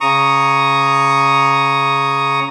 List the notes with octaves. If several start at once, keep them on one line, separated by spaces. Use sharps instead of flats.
C#3 A#5 C#6 D#6